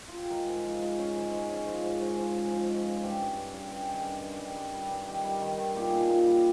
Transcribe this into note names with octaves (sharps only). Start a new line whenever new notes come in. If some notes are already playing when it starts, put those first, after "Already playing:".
F4
G4
G#4
G#3 A#4
G#2
F3
G#3
C#4 G#4
G#2
G#3
C#4
F3
G#2
G#2
F3
C#4
F3
G#3
C#4
G2 G4
G2
G2
G2
G2 G4
G#4
D#3 G4
G2
G2
G3
G2
G3
G2
D#3 G4
G3
D#3
D#3
A#2 G4
A#2 G#4
G4
A#2
G3